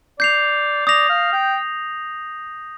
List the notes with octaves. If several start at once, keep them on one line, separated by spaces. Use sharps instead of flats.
D5 G6 C7 F7
D5 D#6 A#6 F7
F5
G5